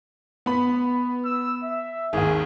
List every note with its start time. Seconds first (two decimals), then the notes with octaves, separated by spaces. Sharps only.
0.46 B3 B5
1.25 E6
1.63 E5
2.13 G#1 D#2 G#4